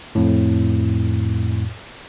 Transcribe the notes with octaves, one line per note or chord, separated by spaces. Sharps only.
F2 A2